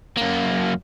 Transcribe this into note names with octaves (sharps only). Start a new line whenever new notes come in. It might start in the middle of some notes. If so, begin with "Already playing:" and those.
F#2 A#3